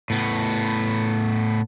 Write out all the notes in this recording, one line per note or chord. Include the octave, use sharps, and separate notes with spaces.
A2 B3